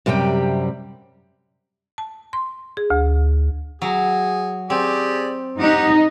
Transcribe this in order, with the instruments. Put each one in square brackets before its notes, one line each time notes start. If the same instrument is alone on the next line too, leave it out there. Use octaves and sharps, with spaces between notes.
[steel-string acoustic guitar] F#2 C3 G3 G4 G5
[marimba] A5
C6
G#4
D2
[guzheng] F#3 [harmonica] G#4
[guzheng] C4 [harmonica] G4 G#4 D5
[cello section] D#4 [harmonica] G4 F#5